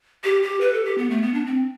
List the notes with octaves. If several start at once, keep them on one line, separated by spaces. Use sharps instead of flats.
G4
G4
B4
A4
G4
B3
A3
B3
D4
C4